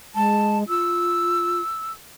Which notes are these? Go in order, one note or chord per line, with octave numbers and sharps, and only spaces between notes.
G#3 A5
F4 E6